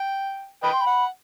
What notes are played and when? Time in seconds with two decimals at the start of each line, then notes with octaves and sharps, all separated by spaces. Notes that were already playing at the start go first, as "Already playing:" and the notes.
Already playing: G5
0.63 B4 D#5 G5 B5
0.72 C6
0.80 B5
0.87 F#5